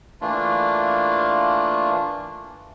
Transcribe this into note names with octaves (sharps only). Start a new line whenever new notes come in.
E3 A3 A#3 D4 F4